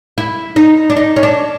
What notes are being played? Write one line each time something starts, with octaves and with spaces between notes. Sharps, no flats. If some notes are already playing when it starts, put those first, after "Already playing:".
E4
D#4
D4
D#4
C#4
D4